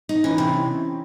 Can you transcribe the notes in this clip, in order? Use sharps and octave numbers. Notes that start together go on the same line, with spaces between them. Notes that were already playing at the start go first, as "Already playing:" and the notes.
D#4
E3 C#4 E4
C3 C4 D#4